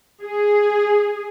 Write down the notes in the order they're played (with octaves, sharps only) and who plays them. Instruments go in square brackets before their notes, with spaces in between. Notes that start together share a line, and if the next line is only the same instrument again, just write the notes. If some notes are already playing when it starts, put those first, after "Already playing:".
[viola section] G#4